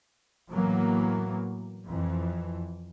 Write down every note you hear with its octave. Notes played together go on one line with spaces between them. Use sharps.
A2 E3 F#3 A#3 B3
F2 E3